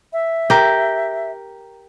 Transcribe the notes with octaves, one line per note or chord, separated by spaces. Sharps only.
E5
G4 A#4